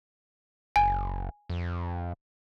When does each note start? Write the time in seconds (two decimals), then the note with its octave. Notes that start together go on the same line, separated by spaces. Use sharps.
0.76 F#1 G#5
1.49 F2